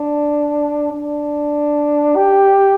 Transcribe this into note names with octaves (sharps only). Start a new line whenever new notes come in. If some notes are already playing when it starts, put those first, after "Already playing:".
Already playing: D4
D4
G4